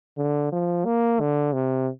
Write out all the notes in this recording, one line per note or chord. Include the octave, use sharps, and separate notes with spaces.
D3
F3
A#3
D3
C3